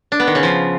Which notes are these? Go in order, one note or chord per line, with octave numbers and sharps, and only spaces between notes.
D4
B3
D#3
C#3
F3